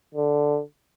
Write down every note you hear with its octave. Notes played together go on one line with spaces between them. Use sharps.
D3